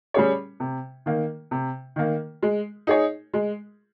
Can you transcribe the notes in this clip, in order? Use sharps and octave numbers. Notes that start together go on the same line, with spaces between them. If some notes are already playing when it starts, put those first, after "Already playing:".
G3 C#4 G#4 C#5
C3
D#3 A#3
C3
D#3 A#3
G#3
D#4 G#4 C#5
G#3